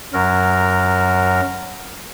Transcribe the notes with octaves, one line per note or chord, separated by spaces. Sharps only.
F#2 F#3 A#4